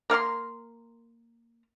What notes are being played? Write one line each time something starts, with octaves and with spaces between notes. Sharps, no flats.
A#3 A#4 D5 C6